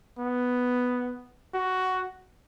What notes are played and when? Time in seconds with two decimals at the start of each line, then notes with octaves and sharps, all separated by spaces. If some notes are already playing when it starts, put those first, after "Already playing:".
0.19 B3
1.54 F#4